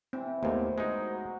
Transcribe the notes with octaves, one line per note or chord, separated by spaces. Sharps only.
E3 C4
D#2 A#2 A3 B3 C5
F#3 G#3 D#4 F#4